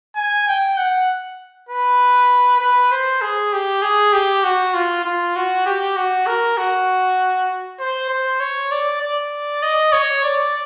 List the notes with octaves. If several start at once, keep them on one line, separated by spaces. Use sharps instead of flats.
G#5
G5
F#5
B4
B4
C5
G#4
G4
G#4
G4
F#4
F4
F4
F#4
G4
F#4
A#4
F#4
C5
C5
C#5
D5
D5
D#5
C#5
D5